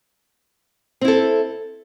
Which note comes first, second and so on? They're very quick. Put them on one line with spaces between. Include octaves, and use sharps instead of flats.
C4 E4 A4